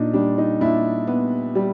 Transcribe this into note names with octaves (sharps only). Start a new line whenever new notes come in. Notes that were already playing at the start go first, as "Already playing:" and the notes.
Already playing: A#2 D4 D#4
G3 D4
D#4
A#2 D4 E4
B3
G3